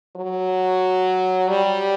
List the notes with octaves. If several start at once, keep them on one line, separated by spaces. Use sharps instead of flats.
F#3
G3